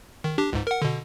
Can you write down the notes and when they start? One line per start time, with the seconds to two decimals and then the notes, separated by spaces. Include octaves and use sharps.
0.24 D#3
0.38 D4 G4
0.53 C#2 G#2
0.67 A#4 F#5
0.82 B2 D3